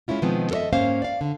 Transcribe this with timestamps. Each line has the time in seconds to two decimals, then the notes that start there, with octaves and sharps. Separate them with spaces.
0.08 G#3 A#3 C#4 E4 F4
0.22 B2 D#3 F3 G#3 B3 C4
0.51 A4 A#4 C#5 D#5 E5
0.73 G#2 A#3 C#4 C5 F5
1.02 D5 F5
1.21 D3